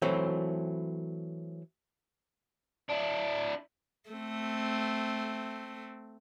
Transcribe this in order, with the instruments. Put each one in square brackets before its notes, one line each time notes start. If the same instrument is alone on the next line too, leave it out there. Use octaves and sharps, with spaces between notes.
[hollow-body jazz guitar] E3 F#3 A3 C4
[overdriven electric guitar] D4 E4
[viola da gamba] A3 C4